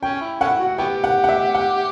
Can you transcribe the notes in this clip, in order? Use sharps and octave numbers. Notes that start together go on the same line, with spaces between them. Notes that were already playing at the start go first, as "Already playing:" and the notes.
C#4 G5
E4
A3 C#4 E4 F#5
F#4
B3 E4 G4 G5
F#5
F#5
E5
F#5